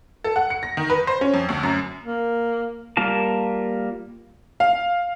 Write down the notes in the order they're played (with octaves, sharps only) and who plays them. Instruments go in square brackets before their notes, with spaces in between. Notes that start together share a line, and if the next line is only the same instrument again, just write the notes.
[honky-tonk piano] A4
F#5
C#7
A#6
D#3
B4
C5
C#4
F2
D2
F#2
[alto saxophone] A#3
[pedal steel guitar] G3 A#3 F4 A#4 A5
[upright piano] F5